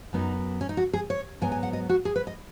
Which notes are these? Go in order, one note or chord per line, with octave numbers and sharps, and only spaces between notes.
F#2 F#3 B3 D#4
C#4
D#4
F#4
G#4
C#5
G#2 F#3 B3 G#5
G#5
F#5
D#5
F#4
G#4
B4
D#5